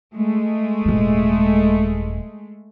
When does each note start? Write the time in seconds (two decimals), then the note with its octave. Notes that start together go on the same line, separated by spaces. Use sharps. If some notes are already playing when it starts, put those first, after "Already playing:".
0.14 G#3 A3
0.85 D#1 G#2